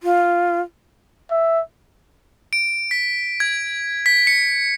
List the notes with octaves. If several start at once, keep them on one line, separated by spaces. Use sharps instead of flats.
F4
E5
D7
B6
G#6
B6
C#7